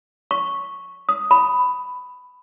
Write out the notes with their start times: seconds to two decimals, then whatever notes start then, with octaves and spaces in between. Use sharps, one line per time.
0.31 C#6
1.09 D#6
1.31 B5